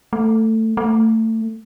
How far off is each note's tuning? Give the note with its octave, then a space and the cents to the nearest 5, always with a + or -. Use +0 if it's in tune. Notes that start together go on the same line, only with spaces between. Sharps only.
A3 +15
A3 +25